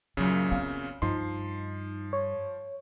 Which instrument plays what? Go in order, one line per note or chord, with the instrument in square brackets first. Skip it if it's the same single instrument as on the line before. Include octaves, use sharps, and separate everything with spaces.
[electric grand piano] F#2 A#2 C#3 [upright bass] F#3
[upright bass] B3 C4 [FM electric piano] F5
[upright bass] G2 [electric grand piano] F3 C6 [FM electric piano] D#4
[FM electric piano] C#5